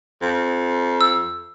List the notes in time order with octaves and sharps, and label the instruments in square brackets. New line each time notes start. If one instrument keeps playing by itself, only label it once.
[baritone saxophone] F2
[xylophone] E6